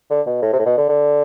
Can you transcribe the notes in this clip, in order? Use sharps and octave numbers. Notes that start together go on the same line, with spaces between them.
D3
B2
A2
C3
A2
B2
D3
D3